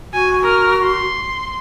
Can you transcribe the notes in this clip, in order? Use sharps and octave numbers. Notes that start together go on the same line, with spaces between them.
F#4 G#5
A#4 F6
C6